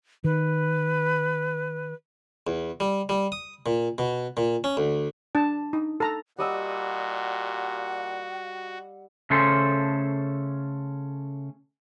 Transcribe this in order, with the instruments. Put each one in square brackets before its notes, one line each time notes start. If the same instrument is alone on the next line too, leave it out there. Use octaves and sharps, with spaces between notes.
[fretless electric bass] D#3 [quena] B4
[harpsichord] E2
G3
G3
D#6
A#2
B2
A#2
C#4
D2
[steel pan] D4 A5
D#4
A4 A#5
[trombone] A#2 [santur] G3 D#5 E6 [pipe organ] F#4 [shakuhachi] F#5
[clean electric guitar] C#3 A3 C#4 A4 C5